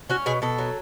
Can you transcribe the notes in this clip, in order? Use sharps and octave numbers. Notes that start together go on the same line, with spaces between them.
C#4 F#4
B2 G#4
B2 A4
F#3